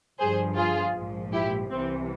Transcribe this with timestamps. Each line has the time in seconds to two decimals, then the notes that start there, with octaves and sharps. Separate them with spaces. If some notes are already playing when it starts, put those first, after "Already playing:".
0.19 G1 G2 F3 G#4 C5
0.57 F4 G#4
0.95 A#1 G#2 F3
1.33 E4 G4
1.70 C2 C3 E3 C4